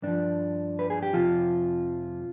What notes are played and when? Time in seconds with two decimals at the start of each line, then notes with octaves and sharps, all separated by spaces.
0.03 G2 F3 D4
0.79 B4
0.90 G#4
1.02 G4
1.13 F2 C3 F3 F4